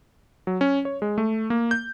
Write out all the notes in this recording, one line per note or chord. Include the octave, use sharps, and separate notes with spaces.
F#3
C#4
C#5
G#3
A3
A#3
G6